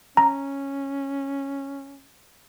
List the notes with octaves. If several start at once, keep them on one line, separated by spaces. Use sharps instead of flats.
C#4 A#5